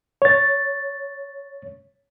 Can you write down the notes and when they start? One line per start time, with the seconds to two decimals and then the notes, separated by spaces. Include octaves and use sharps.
0.22 C#5 A6